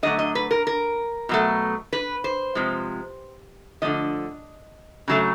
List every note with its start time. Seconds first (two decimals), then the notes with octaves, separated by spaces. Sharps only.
0.03 D3 F#3 A3 D#5
0.19 D#5
0.35 B4
0.51 A#4
0.67 A#4
1.29 B2 F#3 A3
1.93 B4
2.24 C5
2.55 C3 F3 G#3
3.82 D3 F3 A3 D#5
5.08 C#3 F#3 A3